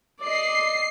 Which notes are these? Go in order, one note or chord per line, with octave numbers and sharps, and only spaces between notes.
D5 D#5 C7